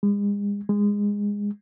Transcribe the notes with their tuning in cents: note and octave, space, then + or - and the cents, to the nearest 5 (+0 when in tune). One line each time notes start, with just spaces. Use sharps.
G#3 -40
G#3 -20